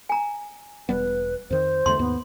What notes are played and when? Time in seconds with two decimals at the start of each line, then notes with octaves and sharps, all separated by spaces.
0.09 G#5 A#5
0.89 E1 G3 B3 B4
1.50 F2 D#3 C5
1.86 E2 D3 A3 C6
1.99 D#2 G#2 B3